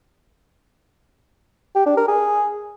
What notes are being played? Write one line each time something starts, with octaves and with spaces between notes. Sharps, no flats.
G4
D4
A#4
G#4